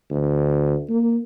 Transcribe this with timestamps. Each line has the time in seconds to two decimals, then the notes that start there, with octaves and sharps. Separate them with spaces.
0.10 D2
0.89 A#3